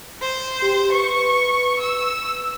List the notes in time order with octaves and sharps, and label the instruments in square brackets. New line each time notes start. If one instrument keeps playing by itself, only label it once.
[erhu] C5
[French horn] G4
[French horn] B4 [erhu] C#6
[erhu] E6